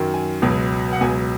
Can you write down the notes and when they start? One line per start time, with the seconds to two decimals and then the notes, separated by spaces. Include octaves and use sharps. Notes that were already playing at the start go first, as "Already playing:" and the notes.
Already playing: F#2 D#3 F#3
0.14 G#5
0.42 C#2 B2 F#3
0.93 F#5
1.00 C#2 B2 F#3 G#5